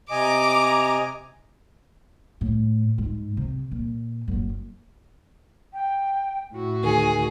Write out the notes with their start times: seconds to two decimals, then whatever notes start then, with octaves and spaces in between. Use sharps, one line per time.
0.11 C3 D#5 G#5 A#5 D6
2.41 A2
2.98 G#2
3.37 C3
3.72 A#2
4.28 F#1 F#2
5.74 G5
6.52 A2 E4 F#4
6.83 D2 D#3 G#4 G#5